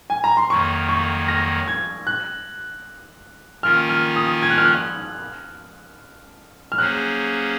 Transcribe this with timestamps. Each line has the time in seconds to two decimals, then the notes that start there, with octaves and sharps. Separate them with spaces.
0.10 G#5
0.24 A#5
0.37 C6
0.50 F2 D#3 F#3 A#3 C#6
0.89 C#6
1.28 A#6
1.68 G#6
2.07 F#6
3.63 D#3 A#3 C#4 F4 A#4 F6
3.89 F6
4.16 D#6
4.43 G#6
4.50 F#6
4.58 F6
4.65 F#6
6.72 F6
6.78 F#3 A#3 C#4 G#4 C5 F#6